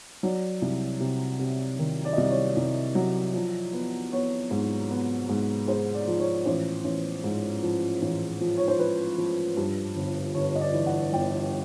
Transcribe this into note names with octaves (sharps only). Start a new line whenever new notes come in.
F#3 D5
C2
C3
C3
D#3
D5
D#5
C2 D5
C#5
C2
F#3
F3
B3
B3 C#5
G#2
B3
G#2
G#3 C5
D5
F3
C#5
A1 C5
A1
G#2
F3
A1
F3
C#5
C5
F3 B4
F3
G2
G1
G1 C#5
D#5
D5
E3
F#5
G1 G5